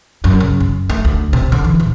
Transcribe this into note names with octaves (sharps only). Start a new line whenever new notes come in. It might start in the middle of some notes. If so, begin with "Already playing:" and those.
F#2
C#3
F#2
A3
D2
C3
D3
E3
D#1